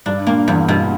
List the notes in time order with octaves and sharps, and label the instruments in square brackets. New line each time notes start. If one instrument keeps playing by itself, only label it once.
[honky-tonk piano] G2 [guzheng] D4
[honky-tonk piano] A#2 [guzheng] A#3
[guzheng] E2 [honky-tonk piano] G2
[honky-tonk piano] G2 [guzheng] B2